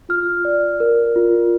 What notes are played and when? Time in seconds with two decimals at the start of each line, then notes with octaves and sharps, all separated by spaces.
0.09 F4 F6
0.45 D5
0.80 A#4
1.16 F4